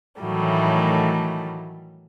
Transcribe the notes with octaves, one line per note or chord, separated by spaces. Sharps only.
A2 D#3 E3 F#3 G3 A3